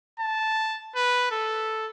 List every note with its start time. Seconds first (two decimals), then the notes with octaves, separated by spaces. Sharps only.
0.20 A5
0.96 B4
1.32 A4